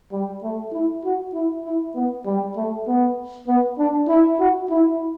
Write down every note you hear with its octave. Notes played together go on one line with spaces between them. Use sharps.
G3
A3
E4
F#4
E4
E4
B3
G3
A3
B3
B3
D4
E4
F#4
E4